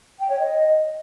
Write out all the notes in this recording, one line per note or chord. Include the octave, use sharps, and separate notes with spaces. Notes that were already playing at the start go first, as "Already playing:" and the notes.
G5
C#5
D#5